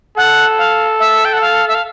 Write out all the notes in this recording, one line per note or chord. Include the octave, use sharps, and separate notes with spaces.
A4 F#5
F5
E5
G5
F#5
F5
E5
F5